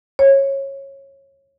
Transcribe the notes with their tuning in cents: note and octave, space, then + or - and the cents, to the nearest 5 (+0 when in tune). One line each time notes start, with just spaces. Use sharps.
C#5 -20